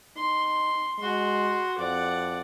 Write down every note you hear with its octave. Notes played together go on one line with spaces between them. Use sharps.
D#4 C6
G#3 F#4 C6
F2 D5 F#5